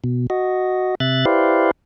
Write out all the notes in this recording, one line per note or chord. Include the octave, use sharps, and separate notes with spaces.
B2
F#4 D#5
C3 E5 F#6 A6
E4 G4 B4 C5 D5 F5